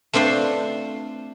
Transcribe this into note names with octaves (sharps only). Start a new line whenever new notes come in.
A3 C4 D4 F4 C5